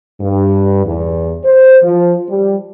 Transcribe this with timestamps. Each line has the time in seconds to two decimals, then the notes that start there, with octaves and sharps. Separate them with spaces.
0.21 G2
0.85 E2
1.44 C5
1.83 F3
2.29 G3